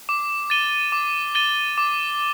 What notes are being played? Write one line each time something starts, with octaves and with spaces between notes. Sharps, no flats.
D6
A6 D#7 G7
D6
A6 D#7 G7
D6